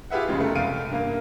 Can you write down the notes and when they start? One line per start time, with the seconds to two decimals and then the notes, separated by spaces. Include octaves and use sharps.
0.10 F4 G4 G#4 B4 E5 F#5
0.28 F1 F#2 C#3 G#3 F4
0.40 A3 A#4
0.55 C2 F5 D7 D#7
0.90 G2 A#3 F5